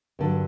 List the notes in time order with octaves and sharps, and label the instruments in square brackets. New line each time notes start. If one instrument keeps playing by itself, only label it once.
[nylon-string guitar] G2 D3 F#3